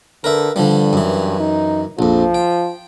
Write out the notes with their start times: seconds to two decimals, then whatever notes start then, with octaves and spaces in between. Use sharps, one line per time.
0.24 D3 A#4 B4 E5
0.56 G2 D3 F3 G3
0.93 F#2 E3
1.40 D#4
1.99 A#1 F2 F3
2.35 G5